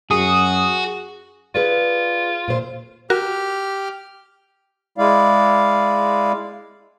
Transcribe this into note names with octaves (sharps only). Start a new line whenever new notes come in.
F#2 F#4 G#4 D#6
F4 G#4 B4 D5
A#2 C5
F#4 G4 A#4 F6
G#3 E4 D5 F5